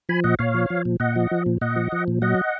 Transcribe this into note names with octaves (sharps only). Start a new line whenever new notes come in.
F3 G#5 B5
A#2 D#5 F#5
A#2 C#5 F5
F3
F3
A#2
A#2 D#5 F#5
F3
F3
A#2
A#2 D#5 F#5
F3
F3
A#2
F#3 D#5 F#5